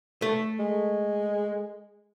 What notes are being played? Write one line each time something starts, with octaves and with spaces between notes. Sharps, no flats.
A3
G#3